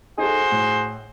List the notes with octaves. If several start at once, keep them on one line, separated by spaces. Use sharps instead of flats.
D#4 F#4 G#4 A4 C5
A2